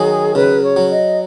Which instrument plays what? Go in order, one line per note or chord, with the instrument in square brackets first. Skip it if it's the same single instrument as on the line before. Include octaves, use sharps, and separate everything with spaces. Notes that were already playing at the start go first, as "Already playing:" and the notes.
Already playing: [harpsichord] D#3 F#3 [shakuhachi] G#4
[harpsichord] C#3 [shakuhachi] B4
[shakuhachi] C#5
[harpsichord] F#3
[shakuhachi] D#5